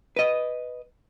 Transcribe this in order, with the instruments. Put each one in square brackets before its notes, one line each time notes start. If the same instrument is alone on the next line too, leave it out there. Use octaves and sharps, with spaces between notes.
[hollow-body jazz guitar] B4 D#5